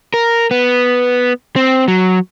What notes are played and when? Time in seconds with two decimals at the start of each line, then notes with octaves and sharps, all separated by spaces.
0.14 A#4
0.51 B3
1.56 C4
1.88 F#3